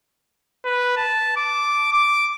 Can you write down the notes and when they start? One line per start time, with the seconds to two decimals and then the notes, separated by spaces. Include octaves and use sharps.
0.65 B4
0.97 A5
1.37 D6
1.93 D6